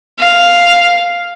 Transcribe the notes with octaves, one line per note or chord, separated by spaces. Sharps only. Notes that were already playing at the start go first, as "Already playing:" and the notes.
F5